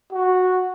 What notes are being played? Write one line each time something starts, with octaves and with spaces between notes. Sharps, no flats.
F#4